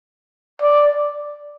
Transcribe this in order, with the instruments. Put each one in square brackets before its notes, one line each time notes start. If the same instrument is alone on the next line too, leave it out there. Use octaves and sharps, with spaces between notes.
[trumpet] D5